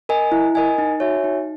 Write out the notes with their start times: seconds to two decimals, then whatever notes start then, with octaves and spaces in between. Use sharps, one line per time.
0.09 A#4 D#5 G#5
0.32 E4
0.55 A#4 D#5 G#5
0.78 D#4
1.00 F#4 C#5 E5 G#5
1.24 D#4